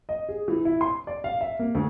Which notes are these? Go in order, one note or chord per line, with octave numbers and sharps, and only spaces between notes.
D#5
G#4
E3
E4
C6
D5
F5
E5
A#3
D2